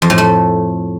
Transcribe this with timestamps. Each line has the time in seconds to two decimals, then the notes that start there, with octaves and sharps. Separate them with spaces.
0.02 F2
0.10 A2
0.18 A3